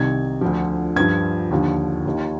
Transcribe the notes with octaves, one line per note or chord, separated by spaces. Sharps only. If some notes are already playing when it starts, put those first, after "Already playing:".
Already playing: C2 C3 D#3 G#6
D2 D3 F3
G2 F3 G#6
D#2 D3 F3
D#2 D#3